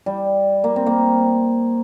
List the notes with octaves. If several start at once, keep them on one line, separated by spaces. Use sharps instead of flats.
G3
A#3
C4
A#3